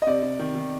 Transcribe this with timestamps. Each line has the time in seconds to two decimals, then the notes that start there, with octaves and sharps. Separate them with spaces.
0.02 D#5
0.07 C3 D5
0.23 C3
0.39 D#3
0.55 D#3